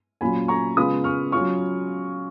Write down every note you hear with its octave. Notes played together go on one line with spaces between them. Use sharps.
A#2 F#3 C#4 F4 G#5 B5
A#5 C#6
C#3 G#3 B3 F4 B5 D#6
C#6 F6
F#3 C#4 F4 C#6 F6